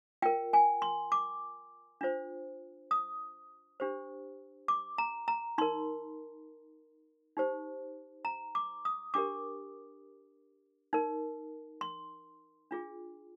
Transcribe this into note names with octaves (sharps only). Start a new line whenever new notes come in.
F4 A#4 G5
G#5
C6
D6
D4 F4 C5
D#6
D4 G4 C5
D6
A#5
A#5
D#4 A#4 C6
D#4 G4 C5
A#5
D6
D#6
D4 G4 A#4 D6
D#4 A#4
C6
D4 F4 G#4